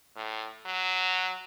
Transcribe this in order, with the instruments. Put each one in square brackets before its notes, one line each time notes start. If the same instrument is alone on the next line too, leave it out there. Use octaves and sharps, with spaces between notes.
[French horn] A2
F#3